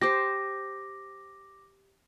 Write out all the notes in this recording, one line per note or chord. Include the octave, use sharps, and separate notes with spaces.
G4 C5 D6 A#6